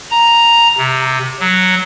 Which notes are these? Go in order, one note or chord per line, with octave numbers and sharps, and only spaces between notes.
A#5
C3
F#3